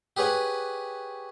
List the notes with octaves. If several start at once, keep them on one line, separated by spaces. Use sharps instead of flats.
G4 G#4 B4 C#5 F#5